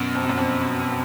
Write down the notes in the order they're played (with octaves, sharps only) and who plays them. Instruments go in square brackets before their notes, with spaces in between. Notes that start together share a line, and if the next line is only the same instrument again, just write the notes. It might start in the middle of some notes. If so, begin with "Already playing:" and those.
Already playing: [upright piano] F#2 [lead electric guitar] B2
[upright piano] F2
F#2
F2